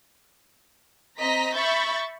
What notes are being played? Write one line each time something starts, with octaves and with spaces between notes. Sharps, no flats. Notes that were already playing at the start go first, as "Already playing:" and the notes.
C4 D#5 A#5 A#6 B6
E5 B5 C#6 G6 A6